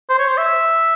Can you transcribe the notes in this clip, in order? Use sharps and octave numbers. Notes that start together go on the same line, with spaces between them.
C5
C#5
C5
E5